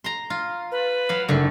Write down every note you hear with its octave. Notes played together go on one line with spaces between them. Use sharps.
A#5 C6
F4
B4
F#3 F5
F#1 D3 A3